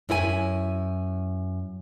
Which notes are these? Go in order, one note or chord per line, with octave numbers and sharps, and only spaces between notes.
F#2 E4 A#4 G#5